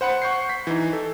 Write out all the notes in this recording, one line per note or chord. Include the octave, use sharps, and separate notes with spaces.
C5 F#5 B5 C#7
F#5 C#6 G6 C7
B6
E3 D#4
A4